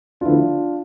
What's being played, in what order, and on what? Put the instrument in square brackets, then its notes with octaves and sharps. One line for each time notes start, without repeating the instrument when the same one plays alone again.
[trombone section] D2 D3 F3 B3 E4 [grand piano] D4 F4